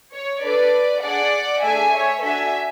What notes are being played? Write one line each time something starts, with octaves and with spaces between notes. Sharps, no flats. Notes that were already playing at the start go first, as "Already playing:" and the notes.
C#5
D4 A4 B4 D5
D4 G#4 D5 F#5
A3 D4 G#4 E5 G#5
C#5 E5
D4 F#4 A4 E5 G#5